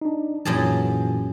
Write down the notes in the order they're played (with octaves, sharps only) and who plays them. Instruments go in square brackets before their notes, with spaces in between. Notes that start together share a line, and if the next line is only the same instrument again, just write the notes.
[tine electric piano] D4 D#4
[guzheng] F#2 G#4 A5 [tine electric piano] A#2 E3